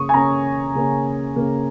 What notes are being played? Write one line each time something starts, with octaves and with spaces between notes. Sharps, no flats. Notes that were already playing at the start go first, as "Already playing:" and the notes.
Already playing: C#3 A#3 C#4 C#6 D#6
G#5
C#3 A#3 C#4 A#5
C#3 A#3 C#4
C#3 A#3 C#4